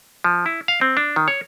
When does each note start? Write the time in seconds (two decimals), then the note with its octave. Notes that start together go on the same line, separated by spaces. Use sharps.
0.24 F3
0.46 E4
0.68 F5
0.81 C4
0.97 D4
1.16 D#3
1.28 C#5